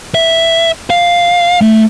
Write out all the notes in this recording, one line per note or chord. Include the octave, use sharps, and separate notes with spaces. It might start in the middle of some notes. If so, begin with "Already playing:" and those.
E5
F5
A3